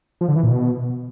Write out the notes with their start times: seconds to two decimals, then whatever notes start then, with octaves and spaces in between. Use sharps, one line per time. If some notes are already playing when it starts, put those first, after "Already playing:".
0.21 F3
0.28 D3
0.36 E3
0.43 A#2
0.51 B2